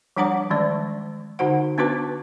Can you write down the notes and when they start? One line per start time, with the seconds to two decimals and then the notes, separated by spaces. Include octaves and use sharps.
0.16 F3 G3 D4 F#5 A#5 D6
0.50 D#3 E3 G#3 C#4 D5
1.39 D3 D#4 F#4 C5 F#5
1.78 B3 C#4 D4 F#4 B4 D6